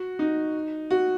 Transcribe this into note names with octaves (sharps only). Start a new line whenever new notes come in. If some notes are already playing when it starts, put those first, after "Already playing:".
Already playing: F#4
D#4
F#4